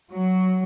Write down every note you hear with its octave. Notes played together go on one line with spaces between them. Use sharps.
F#3